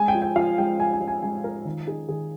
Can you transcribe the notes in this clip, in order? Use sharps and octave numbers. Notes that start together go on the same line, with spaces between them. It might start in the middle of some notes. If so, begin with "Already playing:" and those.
Already playing: G#3 G#5
G5
F3
G5
F3 F5
G#3 G5
F3 G#5
G#5
F3
G#5
G#3 G#5
F3 A#4
D#3
D#4 G#4
D#3 G#4